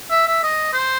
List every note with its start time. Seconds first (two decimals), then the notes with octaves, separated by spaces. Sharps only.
0.11 E5
0.27 E5
0.43 D#5
0.73 C5